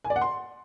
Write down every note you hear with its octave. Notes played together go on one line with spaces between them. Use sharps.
G#5
D5
F#5
C6